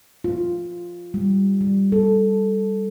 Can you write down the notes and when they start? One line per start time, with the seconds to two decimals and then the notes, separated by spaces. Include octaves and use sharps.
0.24 F4
1.14 G3
1.61 G3
1.92 A4